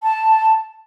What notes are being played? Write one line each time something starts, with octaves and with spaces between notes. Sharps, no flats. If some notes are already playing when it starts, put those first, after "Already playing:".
A5